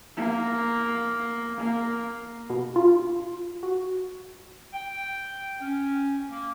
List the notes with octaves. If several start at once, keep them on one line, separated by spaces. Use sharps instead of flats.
A#3
A#3
B2
F4
F#4
G5
C#4
A#3